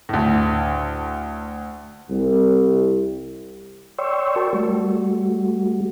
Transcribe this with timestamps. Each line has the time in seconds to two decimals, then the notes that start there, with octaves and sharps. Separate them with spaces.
0.09 D2 A2
2.10 C2
3.98 C#5 D5 G5 C6 C#6 E6
4.36 F#4 A#4 D5 G5 A5 C#6
4.53 G3 A3 F#4